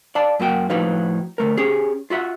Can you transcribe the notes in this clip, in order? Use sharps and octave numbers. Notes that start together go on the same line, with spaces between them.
D5 F5 A5
F#2 A#3 F#4 G5
A2 F3 D#4 F#4 B4 F5
D2 A3 A#4
C#4 G4 G#4
F4 F#4 E5 F#5